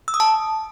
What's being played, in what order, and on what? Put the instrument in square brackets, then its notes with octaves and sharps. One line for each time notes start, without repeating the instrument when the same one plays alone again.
[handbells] E6
D#6
A5